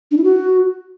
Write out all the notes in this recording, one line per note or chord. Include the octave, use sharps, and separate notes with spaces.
D4
E4
F#4